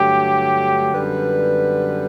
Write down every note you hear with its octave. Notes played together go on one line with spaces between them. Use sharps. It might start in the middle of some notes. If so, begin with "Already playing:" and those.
Already playing: G2 D3 F#3 A3 G4
F#2 D3 G3 B3 B4